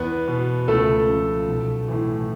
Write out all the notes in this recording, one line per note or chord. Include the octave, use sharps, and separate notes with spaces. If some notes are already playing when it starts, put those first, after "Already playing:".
Already playing: E2 B3 B4
B2
C#2 A3 A4
C#3 F3
B1
A2 E3